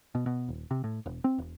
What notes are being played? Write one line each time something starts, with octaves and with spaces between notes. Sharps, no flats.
B2
B2
D#1
C3
A2
E1
C4
E1